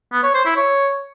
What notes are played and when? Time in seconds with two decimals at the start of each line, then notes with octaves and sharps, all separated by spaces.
0.12 B3
0.23 C#5
0.34 C5
0.45 E4
0.56 C#5